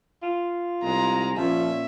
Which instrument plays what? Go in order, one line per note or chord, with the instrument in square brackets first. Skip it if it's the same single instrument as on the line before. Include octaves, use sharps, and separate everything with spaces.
[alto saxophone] F4
[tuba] C2 [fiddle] G#3 [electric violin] A#5
[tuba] A#2 [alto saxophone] F3 [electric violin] C#4 [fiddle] E5